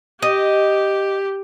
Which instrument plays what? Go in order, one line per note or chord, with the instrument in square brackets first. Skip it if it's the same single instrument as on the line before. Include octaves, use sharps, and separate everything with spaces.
[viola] G4 [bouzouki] D#5